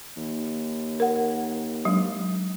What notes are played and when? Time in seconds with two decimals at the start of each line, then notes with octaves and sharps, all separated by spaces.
0.17 D#2
1.00 A#4 F#5
1.85 F#3 G#3 D4